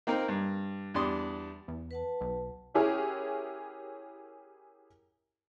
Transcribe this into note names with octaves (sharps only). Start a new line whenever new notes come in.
A#3 C4 D#4 A#4
G2
E2 G3 D4 C6 D#6
E2
B4 F#5 A5
B1
C#4 E4 G4 G#4 A#4 C#5